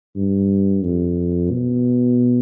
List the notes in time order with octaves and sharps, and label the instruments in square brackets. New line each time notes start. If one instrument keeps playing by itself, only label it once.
[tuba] G2
F2
B2